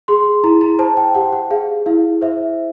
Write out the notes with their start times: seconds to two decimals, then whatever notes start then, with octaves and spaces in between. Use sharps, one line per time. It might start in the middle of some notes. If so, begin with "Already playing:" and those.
0.08 G#4 C6
0.44 E4 A#5
0.61 A#5
0.79 C5 A5
0.97 G5
1.15 G4 F#5
1.32 F#5
1.50 G#4 F5
1.86 E4 F5
2.21 C5 E5